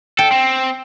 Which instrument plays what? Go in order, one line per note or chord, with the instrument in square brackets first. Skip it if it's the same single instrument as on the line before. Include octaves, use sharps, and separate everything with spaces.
[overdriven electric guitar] A4 [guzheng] G5
[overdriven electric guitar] C4